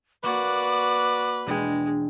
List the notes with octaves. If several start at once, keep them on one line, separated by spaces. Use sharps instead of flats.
A#3 F#4 B4 D5 D6
E1 G#3 D4 G5